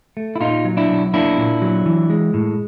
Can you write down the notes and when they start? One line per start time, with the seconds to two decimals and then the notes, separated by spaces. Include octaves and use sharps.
0.17 A3
0.36 E4
0.41 A#2 D#4 F4
0.65 F#3
0.77 D4 E4
0.89 B1
1.14 A#3 D4 E4
1.37 A#2
1.62 F#3
1.86 E3
2.10 G#3
2.34 A2